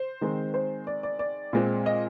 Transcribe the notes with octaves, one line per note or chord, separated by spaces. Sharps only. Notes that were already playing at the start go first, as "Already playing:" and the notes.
Already playing: C5
D#3 G#3 C4
C5
D5
D5
D5
A#2 G#3 C4
D#5